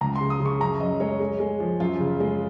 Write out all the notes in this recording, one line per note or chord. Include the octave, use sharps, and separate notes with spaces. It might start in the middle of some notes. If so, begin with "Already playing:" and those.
C#2 A#5
C6
C#3
D#6
C#3
C#6
F#2 A#5
F#2 D#5
G#3 C#5
G#3
G#3
F3
F#2 F4
C#3
G#3